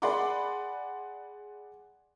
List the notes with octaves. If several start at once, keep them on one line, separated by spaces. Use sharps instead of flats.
G#4 D5 F#5 B5 C6 D6